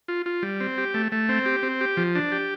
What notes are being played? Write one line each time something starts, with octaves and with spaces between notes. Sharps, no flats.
F4
F4
G3
C4
G4
A3
A3
C4
G4
C4
G4
F3
D4
G4